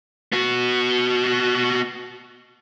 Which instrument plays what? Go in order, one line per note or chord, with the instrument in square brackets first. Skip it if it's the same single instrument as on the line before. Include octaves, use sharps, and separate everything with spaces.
[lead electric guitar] B3 F#4